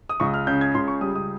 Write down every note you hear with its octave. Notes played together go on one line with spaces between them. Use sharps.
D#6
C#2 C#6
F6
C#3 G6
G#6
C#2 C6
C#6
G3 D#6
D#6